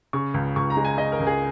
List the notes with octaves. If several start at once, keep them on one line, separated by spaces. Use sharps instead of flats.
C#3 C#6
C#2
C#2 C#6
A#5
G#3
G#5
C#3 D#5
A#4
C#2
G#4